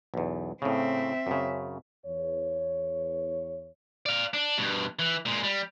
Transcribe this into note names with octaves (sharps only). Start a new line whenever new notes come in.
B1 E2
A2 C#3 C4 E5
F#2 C#3
E2 C#5
D5 F5
D4
G2 B2
E3
A#2 G#3
G3